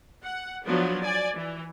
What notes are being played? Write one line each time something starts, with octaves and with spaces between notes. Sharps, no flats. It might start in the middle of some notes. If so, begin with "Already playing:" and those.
F#5
F3 F#3 B3 D4
D5 G#5
E3